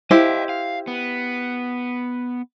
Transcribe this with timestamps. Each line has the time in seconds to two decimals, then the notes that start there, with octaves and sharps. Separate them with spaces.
0.11 E4 G4 C5 D#5 F5
0.49 F5
0.87 B3